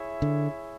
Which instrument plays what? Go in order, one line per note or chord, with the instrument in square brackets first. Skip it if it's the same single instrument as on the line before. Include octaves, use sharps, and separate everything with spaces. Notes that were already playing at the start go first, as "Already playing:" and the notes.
Already playing: [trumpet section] E4 G#4 C#5 E5
[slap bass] D3